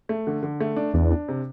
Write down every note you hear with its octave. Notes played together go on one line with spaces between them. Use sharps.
A3
D3
D3
A3
D4
E2 D4
D4
C3